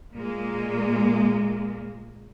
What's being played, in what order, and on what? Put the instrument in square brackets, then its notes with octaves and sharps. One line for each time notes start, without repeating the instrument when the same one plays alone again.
[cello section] A#2 G#3 A#3